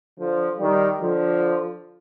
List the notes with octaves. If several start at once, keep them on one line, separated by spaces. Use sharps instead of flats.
D3 F3
D#3 G3
D3 F3